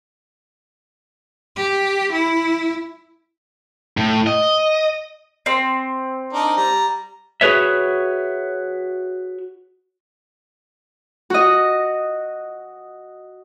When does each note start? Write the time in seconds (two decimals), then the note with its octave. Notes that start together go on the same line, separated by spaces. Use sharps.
1.56 G4
2.12 E4
3.97 A2
4.27 D#5
5.46 C4
6.33 D4 D#4 A#4
6.57 G3 A#5
7.41 F#4 G#4 B4 C#5 E5
11.30 F#4 D#5